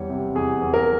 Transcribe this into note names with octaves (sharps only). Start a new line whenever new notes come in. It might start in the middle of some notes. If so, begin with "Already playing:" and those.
Already playing: E2 G3 C#5
C3
E2 G#4
E2
A#4